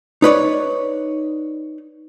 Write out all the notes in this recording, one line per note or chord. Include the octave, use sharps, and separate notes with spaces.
D#4 B4 C#5 D5